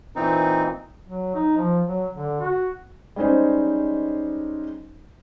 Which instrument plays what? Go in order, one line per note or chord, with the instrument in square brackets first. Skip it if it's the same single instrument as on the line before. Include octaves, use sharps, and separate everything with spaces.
[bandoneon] A#2 E3 C4 D#4
[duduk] F#3
D#4
F3
F#3
D3
F#4
[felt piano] G3 G#3 C#4 D#4 C5